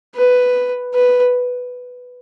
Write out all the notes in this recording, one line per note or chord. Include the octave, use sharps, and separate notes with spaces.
B4
B4